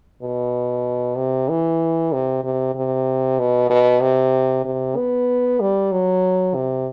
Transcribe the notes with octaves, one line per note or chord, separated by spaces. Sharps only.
B2
C3
E3
C3
C3
C3
B2
B2
C3
C3
B3
G3
F#3
C3